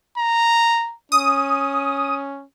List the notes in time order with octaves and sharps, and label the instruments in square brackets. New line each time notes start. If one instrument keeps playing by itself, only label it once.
[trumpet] A#5
[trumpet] C#4 [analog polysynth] D#6